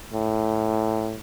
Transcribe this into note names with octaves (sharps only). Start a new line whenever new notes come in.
A2